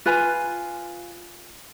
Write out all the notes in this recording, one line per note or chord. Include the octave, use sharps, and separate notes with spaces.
F4 B4 G#5